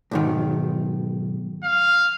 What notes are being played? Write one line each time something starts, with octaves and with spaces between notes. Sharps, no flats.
B1 G#2 D#3
F5